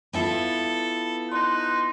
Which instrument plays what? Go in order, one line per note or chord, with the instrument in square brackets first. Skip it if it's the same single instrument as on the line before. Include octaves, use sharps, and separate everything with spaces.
[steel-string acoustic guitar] B3 E4 F4 [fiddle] A4
[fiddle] D#4 [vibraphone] C6 [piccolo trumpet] F#6